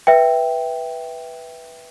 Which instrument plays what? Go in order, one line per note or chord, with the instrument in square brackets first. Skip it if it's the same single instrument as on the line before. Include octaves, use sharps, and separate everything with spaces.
[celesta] B4 E5 G5